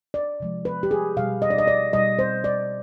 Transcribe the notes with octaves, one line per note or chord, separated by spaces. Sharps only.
D5
C3 F3 G#3
B4
G4
G#4
B2 G3 F5
D#5
D5
D#5
D5
B2 G3 D#5
C5
D5